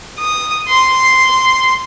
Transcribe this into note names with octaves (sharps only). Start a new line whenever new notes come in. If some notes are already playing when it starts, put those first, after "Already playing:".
D#6
C6